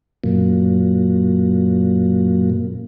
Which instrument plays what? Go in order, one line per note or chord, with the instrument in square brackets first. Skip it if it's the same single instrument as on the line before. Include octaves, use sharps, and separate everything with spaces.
[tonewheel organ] F#2 A#2